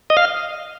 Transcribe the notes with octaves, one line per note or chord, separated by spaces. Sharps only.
D#5
F5